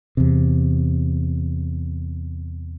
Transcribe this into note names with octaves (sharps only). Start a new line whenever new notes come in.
E2 C3